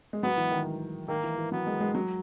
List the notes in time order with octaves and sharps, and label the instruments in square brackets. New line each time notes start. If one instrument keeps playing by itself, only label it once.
[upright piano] G#3
[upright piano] F#3 [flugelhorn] B3
[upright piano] E3
D#3
[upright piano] D#3 [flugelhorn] A#3
[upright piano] E3
E3
[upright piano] F#3 [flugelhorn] B3
[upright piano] G#3
G#3
F#3